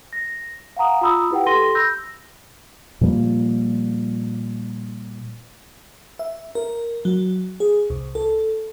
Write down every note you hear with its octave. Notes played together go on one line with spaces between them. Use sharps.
A#6
F5 F#5 G#5 A#5 D#6
F4 A#5 B5 D#6 E6
E4 G4 B4 F#5 G5
G4 A4 C6 A#6 D#7 G7
B5 E6 G6 A#6
A#2 F3 G3 A#3
E5
A#4
F#3
G#4
C2
A4